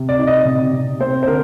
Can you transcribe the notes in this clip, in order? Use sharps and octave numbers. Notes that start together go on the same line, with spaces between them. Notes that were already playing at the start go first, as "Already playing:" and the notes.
Already playing: C3
D5
D#4
D#5
C3
C3
C4 C5
C5
D3 A#4